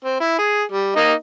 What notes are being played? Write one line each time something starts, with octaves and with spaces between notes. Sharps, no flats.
C4
E4
G#4
G3
A#3 D#4 D#5